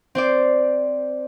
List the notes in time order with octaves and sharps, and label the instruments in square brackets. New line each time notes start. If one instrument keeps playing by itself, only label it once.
[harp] C4 C5 D5